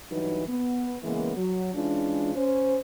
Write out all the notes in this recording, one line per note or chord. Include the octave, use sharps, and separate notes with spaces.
G2 E3 F#3 D#4 B4
B3
C#3 E3 G#3 A#3 B3
F#3
E3 G#3 C#4 D4 F4
C#4 C5